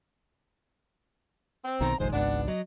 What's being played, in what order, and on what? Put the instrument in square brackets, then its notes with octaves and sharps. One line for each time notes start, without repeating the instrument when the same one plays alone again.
[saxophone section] C4
[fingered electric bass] B1 B2 D#3 [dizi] A#5
[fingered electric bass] F1 A#1 D#3 [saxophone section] G#3 [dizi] C5
[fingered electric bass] G#1 C#2 G#2 [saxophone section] B3 D4 [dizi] F#5
[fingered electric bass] F#3 [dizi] D#5